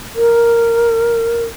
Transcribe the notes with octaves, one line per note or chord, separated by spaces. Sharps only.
A#4